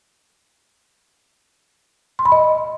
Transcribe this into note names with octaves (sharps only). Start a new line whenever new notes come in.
C6
B5
D#5